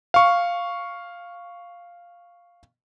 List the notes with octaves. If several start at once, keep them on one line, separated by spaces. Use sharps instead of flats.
F5 C#6